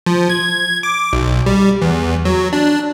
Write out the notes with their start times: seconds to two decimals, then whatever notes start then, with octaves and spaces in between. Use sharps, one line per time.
0.06 F3
0.30 G#6
0.83 D6
1.13 B1
1.46 G3
1.82 E2
2.25 F#3
2.53 D4